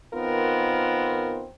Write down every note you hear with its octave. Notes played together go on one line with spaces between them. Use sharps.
D#3 B3 C4 F4 A#4